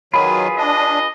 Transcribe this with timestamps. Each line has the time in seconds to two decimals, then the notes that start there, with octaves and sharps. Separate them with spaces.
0.14 D#3 F#3 F4 G#4 B4 B5
0.58 D4 D#5